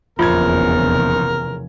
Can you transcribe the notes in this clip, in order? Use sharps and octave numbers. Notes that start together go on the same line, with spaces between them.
F1 A#1 E2 C#3 F4 A#4 G#6